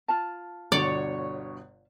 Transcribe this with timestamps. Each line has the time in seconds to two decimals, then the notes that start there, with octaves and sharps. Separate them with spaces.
0.08 F4 A5
0.72 G1 B2 D3 C#5 D5